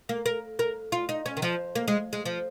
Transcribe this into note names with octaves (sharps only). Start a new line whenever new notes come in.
A#3
A#4
A#4
F4
D#4
C#4
D#3
F3
A#3
G#3
G#3
F3